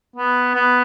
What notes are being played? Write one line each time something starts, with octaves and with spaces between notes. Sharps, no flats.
B3
B3